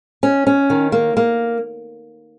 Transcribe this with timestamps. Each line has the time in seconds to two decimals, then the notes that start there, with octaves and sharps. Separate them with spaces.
0.23 C#4
0.47 C#4
0.70 D#3
0.92 A#3
1.17 A#3